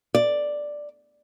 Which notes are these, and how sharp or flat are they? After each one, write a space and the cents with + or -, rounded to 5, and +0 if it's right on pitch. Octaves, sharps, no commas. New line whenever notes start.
D5 +5